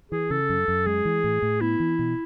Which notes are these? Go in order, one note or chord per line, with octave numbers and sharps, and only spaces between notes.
E3 G#4
C#3 A4
F#2
F#2
G#3 G#4
E3
A2
A2
B3 E4
E3
B2